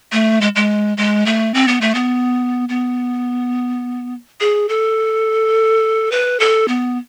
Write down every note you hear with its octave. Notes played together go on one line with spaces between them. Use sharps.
A3
G#3
G#3
G#3
A3
C4
B3
A3
B3
B3
G#4
A4
B4
A4
B3